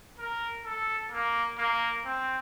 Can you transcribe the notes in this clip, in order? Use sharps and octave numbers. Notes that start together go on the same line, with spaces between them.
A#4
A4
A#3
A#3
C4